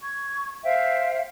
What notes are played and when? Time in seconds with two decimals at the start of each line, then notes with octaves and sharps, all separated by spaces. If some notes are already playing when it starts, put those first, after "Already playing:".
0.03 C#6 G#6
0.64 C5 E5 F5 G5